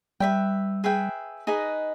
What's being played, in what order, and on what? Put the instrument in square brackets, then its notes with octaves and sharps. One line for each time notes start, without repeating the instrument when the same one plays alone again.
[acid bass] G3 [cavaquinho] B4 E5 G5
[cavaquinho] G#4 B4 E5 G5
D#4 G#4 B4 D#5